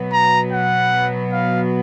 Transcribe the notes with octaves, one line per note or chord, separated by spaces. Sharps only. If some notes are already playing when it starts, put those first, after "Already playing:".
Already playing: B2 F#3 B3
A#5
F#5
F5